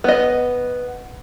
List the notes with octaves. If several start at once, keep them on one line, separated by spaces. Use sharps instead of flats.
B3 D#5